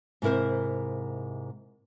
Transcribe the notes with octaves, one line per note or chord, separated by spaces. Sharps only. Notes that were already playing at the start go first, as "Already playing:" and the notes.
G#2 C3 E4 A#4 C5